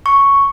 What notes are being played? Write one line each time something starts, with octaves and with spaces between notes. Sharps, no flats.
C#6